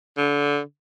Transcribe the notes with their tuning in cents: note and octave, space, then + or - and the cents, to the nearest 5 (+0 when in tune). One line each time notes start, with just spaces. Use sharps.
D3 -25